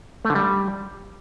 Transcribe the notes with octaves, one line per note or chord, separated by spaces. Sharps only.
A3
D3
G3